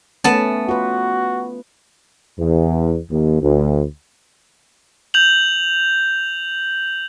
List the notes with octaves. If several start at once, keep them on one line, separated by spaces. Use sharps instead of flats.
A3 B3 C#4 A5
F4 F#4 B4
E2
D#2
D2
G6 F7 F#7